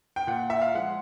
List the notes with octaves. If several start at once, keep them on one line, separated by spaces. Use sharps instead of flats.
G5
A#2 F#5
E5
F5
F3 G#3 F#5